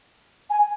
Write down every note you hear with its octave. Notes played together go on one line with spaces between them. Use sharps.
G#5